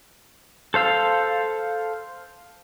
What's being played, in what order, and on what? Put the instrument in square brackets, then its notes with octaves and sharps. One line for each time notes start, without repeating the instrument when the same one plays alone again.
[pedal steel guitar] A4 C5 F5 E6